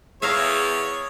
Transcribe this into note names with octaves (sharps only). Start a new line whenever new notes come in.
E2 G#4 C#5 E5 F5 A#5